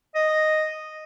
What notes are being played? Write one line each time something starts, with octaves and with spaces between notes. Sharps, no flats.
D#5